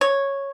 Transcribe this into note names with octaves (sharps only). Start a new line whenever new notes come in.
C#5